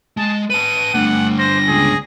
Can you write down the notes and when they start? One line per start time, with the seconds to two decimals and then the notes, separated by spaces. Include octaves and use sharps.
0.17 G#3 A5
0.50 B4 A5 D#7
0.94 G2 D3 A3 F#5
1.39 C5 A#6
1.68 C#2 G#4